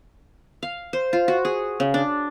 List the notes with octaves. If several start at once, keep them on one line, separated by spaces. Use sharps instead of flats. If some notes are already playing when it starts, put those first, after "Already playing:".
F5
C5
F4
F#4
G#4
C#3
D4